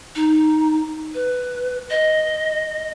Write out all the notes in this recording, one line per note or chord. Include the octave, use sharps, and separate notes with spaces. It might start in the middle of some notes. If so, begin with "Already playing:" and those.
D#4
B4
D#5